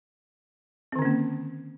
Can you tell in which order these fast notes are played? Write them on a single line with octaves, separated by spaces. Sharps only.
C4 D#3 D3 C#4 A#3